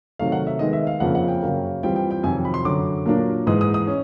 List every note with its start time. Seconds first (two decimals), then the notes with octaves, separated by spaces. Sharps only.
0.19 C3 D#3 F#3 A3 F5
0.32 F#5
0.47 E5
0.59 D#3 G#3 B3 D#5
0.73 E5
0.87 F5
1.00 F2 C#3 F3 A#3 F#5
1.15 F#5
1.28 G5
1.42 F#2 C#3 F#3 A#3
1.83 E3 G3 C4 F4 G5
1.96 G5
2.11 G5
2.23 F2 C3 D#3 F#3 G#5
2.45 B5
2.54 C6
2.65 F#2 D3 F#3 D6
3.06 A#2 F#3 A#3 D4
3.47 G#2 E3 G#3 D#6
3.61 D#6
3.74 D#6
3.87 C#4